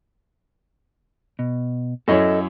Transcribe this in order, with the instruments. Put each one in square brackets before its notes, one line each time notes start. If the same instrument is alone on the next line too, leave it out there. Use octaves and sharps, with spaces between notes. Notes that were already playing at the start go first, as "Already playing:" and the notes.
[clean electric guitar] B2
[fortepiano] F#2 E4 C#5 [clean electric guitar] A4 D#5